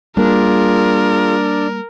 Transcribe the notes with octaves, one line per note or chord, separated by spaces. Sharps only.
G3 A#3 D4 F4 G#4 A#4